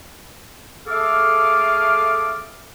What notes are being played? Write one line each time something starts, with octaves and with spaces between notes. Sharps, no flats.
A3 G#4 A4 F5 D6 F6